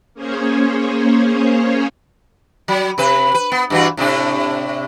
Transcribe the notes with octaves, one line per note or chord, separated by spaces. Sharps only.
A#3 C#4 G#4 C5 C#5
F#3
C3 B4
B4
B3
G2 E3 F#4
A2 C3 D4